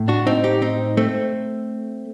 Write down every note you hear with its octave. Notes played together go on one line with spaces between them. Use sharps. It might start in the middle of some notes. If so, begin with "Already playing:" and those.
Already playing: A2
D4 F#4
C4 D#4
D#4 G4
C4 D#4
A3 C4